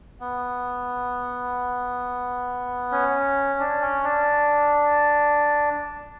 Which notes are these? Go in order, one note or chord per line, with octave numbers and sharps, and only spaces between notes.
B3
C#4
D4
C#4
D4